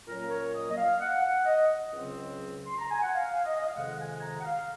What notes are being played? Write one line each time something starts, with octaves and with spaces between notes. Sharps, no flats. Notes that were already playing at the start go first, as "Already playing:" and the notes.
A#2 F#3 A#3 C#4 A#4
C#5
D#5
D#5
F5
F#5
F#5
D#5
C#2 C#3 F#3 C4
C6
A#5
G#5
F#5
F5
D#5
D#5
F5
F2 C3 D#3 G#3 F#5
G#5
A#5
F#5
F5